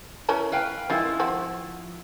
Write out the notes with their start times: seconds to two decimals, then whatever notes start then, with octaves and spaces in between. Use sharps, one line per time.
0.29 E3 C#4 A#4
0.52 B4 F5 G5
0.90 D#3 F3 G#3 E4
1.20 C4 F#4